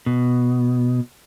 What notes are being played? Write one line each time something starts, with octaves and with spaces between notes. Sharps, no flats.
B2